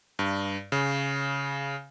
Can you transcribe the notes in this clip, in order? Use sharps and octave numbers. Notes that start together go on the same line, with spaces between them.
G2
C#3